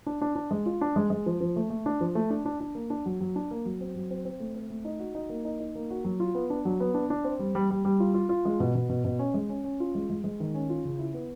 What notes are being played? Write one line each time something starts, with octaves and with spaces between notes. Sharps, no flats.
D4
D4
D4
G#3
F4
D4
G#3
G#3
F3
F3
A3
A3
D4
F3
A3
D4
D4
D4
A#3
D4
F#3
F#3
D4
A#3
F#3
C4
F#3
C4
C4
A3
C4
A3
D#4
F#4
D#4
A#3
D#4
D#4
A#3
F#4
F#3
F4
B3
D4
F#3
B3
D4
D4
C4
G3
G3
G3
G3
F4
F4
F4
G#3
B2
B2
B2
B2
C#4
G#3
C#4
C#4
F4
G#3
G#3
G#3
D#3
C#4
F4
C#3
E4
B3